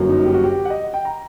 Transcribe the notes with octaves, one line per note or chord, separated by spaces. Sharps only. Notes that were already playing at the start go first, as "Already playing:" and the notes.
Already playing: G1 F#2 F#3 A#3
D#4
G4
F#4
G4
F#5
D#5
G5
A#5